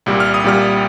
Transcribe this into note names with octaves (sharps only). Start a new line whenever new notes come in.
C2 A#2 G3
F6
D#6
C2 A#2 G3 F6